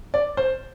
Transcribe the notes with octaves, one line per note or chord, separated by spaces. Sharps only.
D5
C5